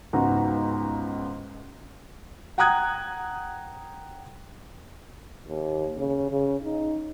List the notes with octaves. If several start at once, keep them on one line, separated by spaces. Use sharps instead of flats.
C#2 G#2 B3 F#4 A#5
F#5 G5 A#5 D#6 F#6 G#6
D#2
C#3
C#3
D#4